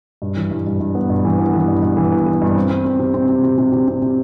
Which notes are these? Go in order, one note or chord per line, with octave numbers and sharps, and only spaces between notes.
G2
E3
G2
G2
G2
B3
G2
E3
B3
E3
G2
G2
E3
B3
E3
G2
C4
C4
C4
C3
C4
C3
C3
C3
C3
C3
C3